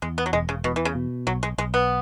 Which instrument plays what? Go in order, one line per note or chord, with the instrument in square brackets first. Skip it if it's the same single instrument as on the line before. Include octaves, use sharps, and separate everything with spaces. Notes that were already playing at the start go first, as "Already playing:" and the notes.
[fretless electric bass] E2 [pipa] G#3
[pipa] B3
F#3
[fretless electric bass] E1 [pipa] G#3
[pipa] C#3
[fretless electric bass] E2 [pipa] B2
[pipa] E3
C#3
[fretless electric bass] B2
[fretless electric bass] B1 [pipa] F#3
[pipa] G#3
[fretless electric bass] B1 [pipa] G#3
[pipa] B3